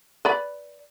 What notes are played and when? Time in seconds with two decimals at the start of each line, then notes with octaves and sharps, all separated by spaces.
0.25 B4 D5 B5